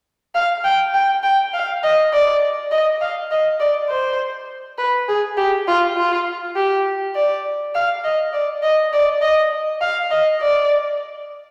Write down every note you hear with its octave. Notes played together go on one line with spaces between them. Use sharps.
F5
G5
G5
G5
F5
D#5
D5
D#5
F5
D#5
D5
C5
B4
G#4
G4
F4
F4
G4
D5
F5
D#5
D5
D#5
D5
D#5
F5
D#5
D5